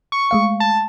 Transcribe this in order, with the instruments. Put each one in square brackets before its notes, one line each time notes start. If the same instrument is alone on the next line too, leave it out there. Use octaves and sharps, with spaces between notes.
[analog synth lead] C#6
[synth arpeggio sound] G#3 A3 F5
[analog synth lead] A5